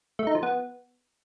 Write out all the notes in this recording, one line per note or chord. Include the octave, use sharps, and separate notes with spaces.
A3
D#4
F3
B3